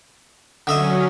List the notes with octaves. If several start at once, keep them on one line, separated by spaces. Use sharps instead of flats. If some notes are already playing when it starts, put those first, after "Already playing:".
D3 F#3 C#4 D#5 E5